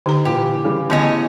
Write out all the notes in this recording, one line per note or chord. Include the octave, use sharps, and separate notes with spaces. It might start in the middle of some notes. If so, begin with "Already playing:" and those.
D3 D#4 G4 A#5
A#2 E3 G4
C#3 E3 G3
A2 D3 B3 C#5 D#5 G#5